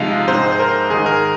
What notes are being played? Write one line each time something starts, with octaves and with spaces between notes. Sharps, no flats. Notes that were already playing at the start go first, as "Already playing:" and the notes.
Already playing: C3 F3 G#3 D#4 F5
G#2 G#3 C4 D#4 C5
C5
A#4
G#2 D#3 G#3 D#4 G#4
A#4